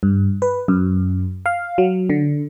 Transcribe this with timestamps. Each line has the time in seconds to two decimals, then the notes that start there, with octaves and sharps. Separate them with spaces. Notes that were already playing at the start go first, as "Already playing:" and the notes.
0.03 G2
0.42 B4
0.68 F#2
1.46 F5
1.78 F#3
2.10 D3